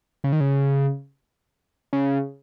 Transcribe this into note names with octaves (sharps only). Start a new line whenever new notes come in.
C#3
D#3
C#3
C#3